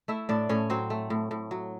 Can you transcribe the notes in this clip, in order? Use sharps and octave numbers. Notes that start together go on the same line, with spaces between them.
A3 E4 E5
A2 D4 D5
A2 C#4 C#5
F#3 C4 C5
A3
A2
A2
F#3